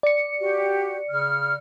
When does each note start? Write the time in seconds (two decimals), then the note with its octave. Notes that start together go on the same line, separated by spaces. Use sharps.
0.03 D5 C#7
0.41 F#4 G4
1.10 C#3 F6